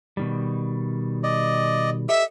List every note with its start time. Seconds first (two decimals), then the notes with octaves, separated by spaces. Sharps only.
0.17 B2 D#3 G3
1.23 D5 D#5
2.09 G4 A4 D#5 E5